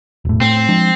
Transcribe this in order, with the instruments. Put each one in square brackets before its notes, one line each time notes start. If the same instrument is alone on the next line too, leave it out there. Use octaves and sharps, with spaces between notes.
[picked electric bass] E1 A2
[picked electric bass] A2 [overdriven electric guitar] C4
[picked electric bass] F3 G#3 D4